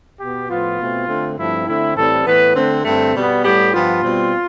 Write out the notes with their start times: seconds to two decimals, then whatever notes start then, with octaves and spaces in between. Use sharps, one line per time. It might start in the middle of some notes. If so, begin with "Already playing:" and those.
0.19 B2 B3 G4
0.49 A2 F3 B3 F4
0.78 B2 A3 C4
1.08 D3 A3 C4
1.37 G2 F3 A3 C4 E4
1.67 D3 A3 C4 E4
1.97 A2 E3 G3 C4 A4
2.26 A2 E3 B3 B4
2.56 D3 A3 C4
2.85 G2 D3 A3 C4
3.14 B2 G3 B3
3.44 A2 G3 B3 G4
3.74 G2 F3 B3 F4
4.04 B2 G3 C4